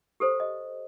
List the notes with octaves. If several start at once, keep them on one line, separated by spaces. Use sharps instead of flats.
G4 A4 C5
D#5